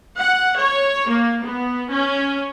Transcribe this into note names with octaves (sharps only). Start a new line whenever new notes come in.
F#5
C#5
A#3
B3
C#4